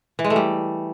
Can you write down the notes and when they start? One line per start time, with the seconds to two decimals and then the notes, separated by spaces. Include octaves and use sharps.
0.19 E3
0.24 G#3
0.30 A3
0.36 G3